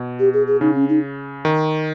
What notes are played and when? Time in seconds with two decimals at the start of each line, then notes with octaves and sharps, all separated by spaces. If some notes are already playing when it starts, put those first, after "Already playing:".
Already playing: B2
0.20 G4
0.34 G#4
0.47 G#4
0.61 C#3 D#4
0.75 C#4
0.89 D#4
1.45 D#3